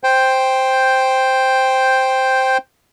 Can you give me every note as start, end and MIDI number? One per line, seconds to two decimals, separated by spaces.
0.04 2.57 72
0.04 2.57 79